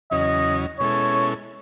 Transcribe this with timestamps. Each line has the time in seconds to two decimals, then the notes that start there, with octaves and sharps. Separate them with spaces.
0.11 E2 C#3 F#3 C#4 D#5
0.79 B2 G#3 C#4 E4 A4 C#5